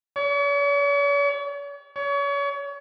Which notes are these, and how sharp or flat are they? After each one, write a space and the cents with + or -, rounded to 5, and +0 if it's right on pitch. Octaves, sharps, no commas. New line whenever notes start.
C#5 +45
C#5 +35